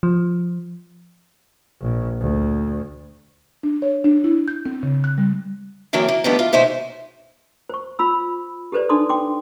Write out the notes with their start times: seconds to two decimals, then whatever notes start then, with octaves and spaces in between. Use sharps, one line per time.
0.03 F3
1.80 A#1
2.20 D2
3.63 D4
3.82 C#5
4.04 D4
4.24 E4
4.48 G6
4.66 C4
4.83 C#3
5.04 F#6
5.18 G3
5.93 D3 E3 F#3 A#3 C4 D4
6.08 A#3
6.24 D#3 F3 G3 A3 B3 D4
6.39 F4
6.53 D#2 B2 G#3 D#4 C5 E5
7.69 C5 C#6
7.99 F4 B5 E6
8.72 G4 A4 B4 C5 D5
8.89 D4 D#4 A4 C6 D6 D#6
9.09 G5 C6 D6